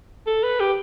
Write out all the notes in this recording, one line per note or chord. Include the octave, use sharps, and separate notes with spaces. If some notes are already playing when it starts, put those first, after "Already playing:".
A4
B4
G4